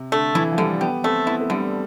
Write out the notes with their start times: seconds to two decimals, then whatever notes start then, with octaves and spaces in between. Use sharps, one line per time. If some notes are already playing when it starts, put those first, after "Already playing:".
Already playing: C3
0.12 D3 A3
0.35 E3 E4
0.52 F3
0.58 D3 G3
0.81 B3 G4
1.04 A3 C4
1.27 B3 E4
1.41 A3
1.50 D3 G3